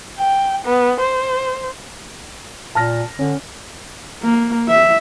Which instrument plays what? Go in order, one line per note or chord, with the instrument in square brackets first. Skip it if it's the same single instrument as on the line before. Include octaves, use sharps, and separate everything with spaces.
[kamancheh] G5
B3
C5
[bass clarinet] A#2 [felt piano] A5 F6 A#6
[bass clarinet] D3 [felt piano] C#4
[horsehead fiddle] A#3
E5